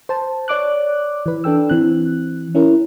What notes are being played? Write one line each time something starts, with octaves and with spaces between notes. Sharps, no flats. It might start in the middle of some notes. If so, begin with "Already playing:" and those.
C5 A5
C#5 D5 D6 F#6
E3 B4
D4 A4 G5 E6
E3 C4 F#6
C#4 E4 A#4